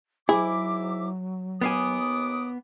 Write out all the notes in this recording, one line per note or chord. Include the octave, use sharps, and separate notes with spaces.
G#2 F#3 E4 G#4 E5 D6
D#2 B3 F5 G#5 D6 D#6